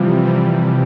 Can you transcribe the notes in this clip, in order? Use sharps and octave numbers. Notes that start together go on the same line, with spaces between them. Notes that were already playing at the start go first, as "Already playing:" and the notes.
Already playing: C3 E3 F3 G3
C3 E3 G3